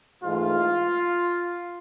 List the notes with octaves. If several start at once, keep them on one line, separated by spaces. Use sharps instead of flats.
G#2 E3 A3 F4